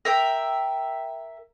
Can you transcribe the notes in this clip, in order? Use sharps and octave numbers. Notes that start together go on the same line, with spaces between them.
A#4 E5 G5